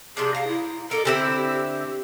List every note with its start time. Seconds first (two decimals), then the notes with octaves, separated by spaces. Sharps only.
0.17 C3 F3 D4 G#4
0.35 F5 A#5
0.48 E4
0.91 A4 A#4 D5 D#5
1.05 D3 C4 E4 G4
1.53 G4